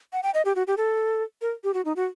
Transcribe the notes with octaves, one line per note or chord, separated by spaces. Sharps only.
F#5
G5
D#5
G4
F#4
G4
A4
A#4
G4
F#4
D#4
F#4